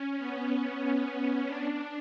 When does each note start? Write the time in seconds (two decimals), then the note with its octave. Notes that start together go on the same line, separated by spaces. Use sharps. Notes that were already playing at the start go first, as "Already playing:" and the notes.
Already playing: C#4
0.19 B3
1.47 D4